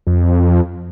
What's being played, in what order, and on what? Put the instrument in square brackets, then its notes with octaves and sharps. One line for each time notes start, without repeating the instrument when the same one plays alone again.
[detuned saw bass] F2